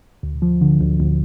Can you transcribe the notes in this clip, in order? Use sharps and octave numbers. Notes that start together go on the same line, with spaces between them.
D2
F3
D3
D2
D2